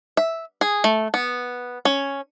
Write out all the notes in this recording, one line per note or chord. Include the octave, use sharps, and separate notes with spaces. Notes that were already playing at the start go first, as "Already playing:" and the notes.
E5
G#4
A3
B3
C#4